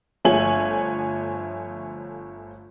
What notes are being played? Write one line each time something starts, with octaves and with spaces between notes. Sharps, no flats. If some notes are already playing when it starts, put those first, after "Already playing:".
G1 F3 A3 C#5 G#5 F#7